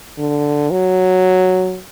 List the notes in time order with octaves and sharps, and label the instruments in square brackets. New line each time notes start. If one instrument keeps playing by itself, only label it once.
[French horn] D3
F#3